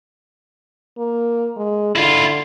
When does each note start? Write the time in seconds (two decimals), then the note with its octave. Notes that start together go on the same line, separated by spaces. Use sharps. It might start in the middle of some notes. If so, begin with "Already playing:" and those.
0.97 A#3
1.57 G#3
1.96 D3 E4 F4